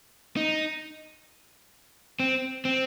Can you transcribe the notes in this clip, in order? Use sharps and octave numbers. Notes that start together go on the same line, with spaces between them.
D#4
C4
C4